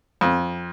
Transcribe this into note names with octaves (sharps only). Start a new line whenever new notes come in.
F2